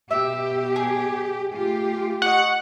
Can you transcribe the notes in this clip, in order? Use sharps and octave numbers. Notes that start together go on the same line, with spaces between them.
B2 G4 E5
G#4
A3 F4 G4
D#5 F#5 C#6